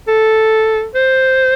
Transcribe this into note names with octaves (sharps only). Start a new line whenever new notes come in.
A4
C5